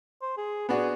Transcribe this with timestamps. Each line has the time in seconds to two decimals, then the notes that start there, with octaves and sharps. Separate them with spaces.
0.22 C5
0.37 G#4
0.69 B3 D4 F#4 G#4